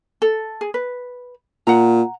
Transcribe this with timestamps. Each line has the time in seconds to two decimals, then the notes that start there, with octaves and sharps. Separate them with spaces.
0.22 A4
0.61 G#4
0.74 B4
1.67 A#2 F#5 A#5